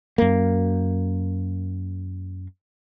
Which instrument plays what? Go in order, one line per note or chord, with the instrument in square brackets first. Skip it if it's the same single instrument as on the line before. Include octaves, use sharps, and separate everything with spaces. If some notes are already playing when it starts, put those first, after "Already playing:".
[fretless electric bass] F#2 A#3